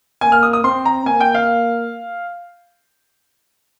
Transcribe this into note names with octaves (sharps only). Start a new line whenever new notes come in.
A#3 G#5
F6
D#6
D#6
C4 C6
A#5
A#3 G#5
G5
F5